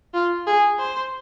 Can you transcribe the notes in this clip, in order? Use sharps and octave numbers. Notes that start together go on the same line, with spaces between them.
F4
G#4
C5